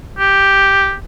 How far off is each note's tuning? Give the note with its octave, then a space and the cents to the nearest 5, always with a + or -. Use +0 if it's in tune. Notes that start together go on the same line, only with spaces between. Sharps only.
G4 +0